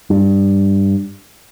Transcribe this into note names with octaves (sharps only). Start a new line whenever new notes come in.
G2